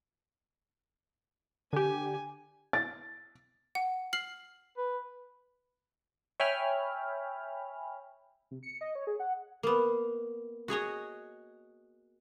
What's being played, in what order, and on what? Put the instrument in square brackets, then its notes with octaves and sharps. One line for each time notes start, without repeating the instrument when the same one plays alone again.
[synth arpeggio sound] D3 G4 [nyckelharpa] G#5
[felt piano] A6
[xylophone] F#5
F6 C7 F#7
[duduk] B4
[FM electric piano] C#5 E5 G5 G#5 B5 F6
[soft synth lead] C3
C#7
D#5
C#5
G#4
F#5
[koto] A#3 B3
F#4 G#4 C#5 D#5